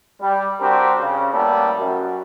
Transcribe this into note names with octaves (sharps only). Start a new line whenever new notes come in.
G3
G3 C4 D4 F#4 G4 A#4
C#3
A2 G3 A#3 B3 G4 A4
F#2